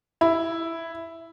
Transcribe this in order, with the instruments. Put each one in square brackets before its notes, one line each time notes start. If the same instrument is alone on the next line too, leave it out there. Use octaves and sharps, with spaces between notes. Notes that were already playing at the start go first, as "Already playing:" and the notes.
[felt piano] E4